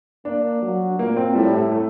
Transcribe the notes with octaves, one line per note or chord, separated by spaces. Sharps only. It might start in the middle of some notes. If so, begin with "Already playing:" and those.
A#3 D4
F#3
A#2 A#3
C4
A2 G3
A3
A3